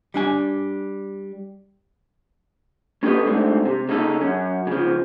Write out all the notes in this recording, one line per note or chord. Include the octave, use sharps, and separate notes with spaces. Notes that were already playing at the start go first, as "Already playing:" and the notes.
G3 D4 G#5
A#3 C#4 G4 A4 B4 D#5
G#2 A3 C4 D4
C3
C#3 A#3 D#4 A4
F#2 C#4
C#3 F3